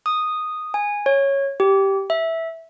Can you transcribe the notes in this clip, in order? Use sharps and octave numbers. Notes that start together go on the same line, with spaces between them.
D#6
G#5
C#5
G4
E5